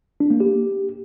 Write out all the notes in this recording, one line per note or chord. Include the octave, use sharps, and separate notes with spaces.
D4
A#3
G4